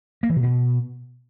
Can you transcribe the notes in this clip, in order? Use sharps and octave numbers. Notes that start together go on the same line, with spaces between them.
A#3
E3
C3
B2